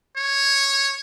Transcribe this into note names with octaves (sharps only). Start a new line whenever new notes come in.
C#5